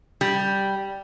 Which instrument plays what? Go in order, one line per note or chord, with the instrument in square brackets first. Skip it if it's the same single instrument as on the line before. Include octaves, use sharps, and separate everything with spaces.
[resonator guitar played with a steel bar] G3